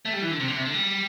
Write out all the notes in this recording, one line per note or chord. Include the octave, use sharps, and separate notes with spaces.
A3
G3
E3
D3
C3
D3
C3
D3
G3